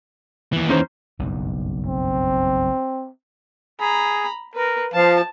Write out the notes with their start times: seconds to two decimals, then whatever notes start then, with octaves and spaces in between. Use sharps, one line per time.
0.53 D#2 E3
0.69 C#4 D#4 C5
1.19 F#1 B1 G2
1.86 C4
3.80 G#4 A#5 B5
4.55 A#4 B4
4.94 F3 F5 A5